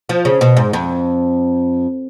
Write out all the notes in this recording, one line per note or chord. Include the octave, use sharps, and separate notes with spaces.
F3
C#3
B2
G#2
F2